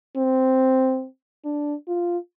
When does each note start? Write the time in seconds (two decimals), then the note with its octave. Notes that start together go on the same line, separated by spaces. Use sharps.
0.16 C4
1.45 D4
1.88 F4